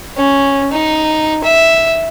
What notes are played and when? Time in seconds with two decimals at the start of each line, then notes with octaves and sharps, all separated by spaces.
0.17 C#4
0.72 D#4
1.44 E5